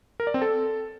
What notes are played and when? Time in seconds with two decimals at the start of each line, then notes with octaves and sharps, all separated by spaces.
0.20 A#4
0.27 D5
0.34 C4
0.42 A4